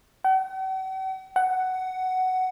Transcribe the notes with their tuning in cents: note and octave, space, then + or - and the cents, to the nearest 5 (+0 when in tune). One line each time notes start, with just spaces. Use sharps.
F#5 +45
F#5 +10